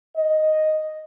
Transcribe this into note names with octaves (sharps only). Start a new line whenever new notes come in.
D#5